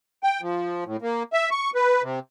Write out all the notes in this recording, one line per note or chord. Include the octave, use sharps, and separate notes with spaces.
G5
F3
A2
A#3
E5
C#6
B4
C3